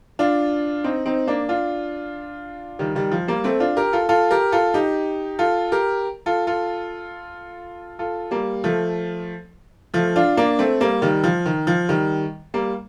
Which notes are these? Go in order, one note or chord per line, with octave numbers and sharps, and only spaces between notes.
D4 F4
C4 D#4
C4 D#4
A#3 D4
D4 F4
D#3 G3
D#3 G3
F3
G3 A#3
A3 C4
D4 F4
G4 A#4
F4 A4
F4 A4
G4 A#4
F4 A4
D#4 G4
F4 A4
G4 A#4
F4 A4
F4 A4
F4 A4
G3 A#3
F3 A3
F3 A3
D4 F4
A#3 D4
A3 C4
G3 A#3
D#3 G3
F3
D#3
F3
D#3 G3
G3 A#3